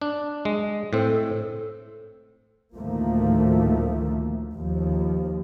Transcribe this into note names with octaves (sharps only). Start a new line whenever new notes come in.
D4
G#3
A2 C4 A4
D2 A2 D#3 F3 A3 A#3
D#2 F3